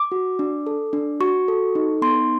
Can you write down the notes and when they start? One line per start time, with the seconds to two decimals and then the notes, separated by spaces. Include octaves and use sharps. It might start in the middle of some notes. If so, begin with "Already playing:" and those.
Already playing: D6
0.12 F#4
0.39 D4
0.67 A4
0.93 D4
1.20 F#4 C#6
1.48 A4
1.75 D#4
2.02 B3 C6